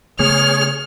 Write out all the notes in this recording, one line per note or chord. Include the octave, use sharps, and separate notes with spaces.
C#3 A3 B3 G#4 C#5 F6